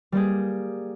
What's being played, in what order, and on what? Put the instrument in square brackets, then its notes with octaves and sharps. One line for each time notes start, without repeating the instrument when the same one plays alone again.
[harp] G3 A#3 G4 G#4